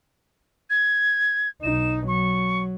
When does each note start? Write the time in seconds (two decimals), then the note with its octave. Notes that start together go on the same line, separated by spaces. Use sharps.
0.70 G#6
1.63 B1 D#4 E7
2.08 F#3 C#6